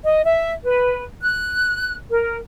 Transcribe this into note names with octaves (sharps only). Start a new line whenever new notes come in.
D#5
E5
B4
F#6
A#4